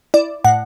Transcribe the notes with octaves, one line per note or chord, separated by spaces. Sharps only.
E4 D5
A2 F#5